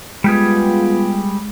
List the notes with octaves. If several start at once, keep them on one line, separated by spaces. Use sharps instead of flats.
G3 G#3 B3 F4 G4 G#4